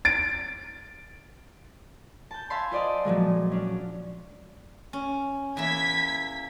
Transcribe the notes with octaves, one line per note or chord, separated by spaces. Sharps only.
A6 D7
A5 G6
E5 F5 G#5 A5 B5 C6
F4 C5 D5 D#5 F5
A#2 F3 F#3 G#3
C#4 D4
C#4
E2 A#3 E4 G#6 B6